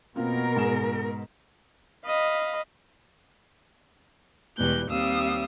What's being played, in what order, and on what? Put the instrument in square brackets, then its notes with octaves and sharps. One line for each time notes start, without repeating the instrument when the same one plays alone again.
[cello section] B2 A#4 [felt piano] A#3 C4 F4
[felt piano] G#2 G#4 E7
[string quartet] D#5 F5 B5
E2 B2 G3 G#3 F#6 G6
D#2 G3 C4 F5 D#6 E6